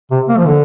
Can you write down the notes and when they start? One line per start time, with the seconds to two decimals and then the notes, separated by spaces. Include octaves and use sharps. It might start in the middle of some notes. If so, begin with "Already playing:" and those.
0.11 C3
0.29 A#3
0.37 F3
0.47 D3